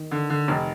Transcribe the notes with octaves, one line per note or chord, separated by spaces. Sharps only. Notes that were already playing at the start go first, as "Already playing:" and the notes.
Already playing: D#3
D3
D3
F1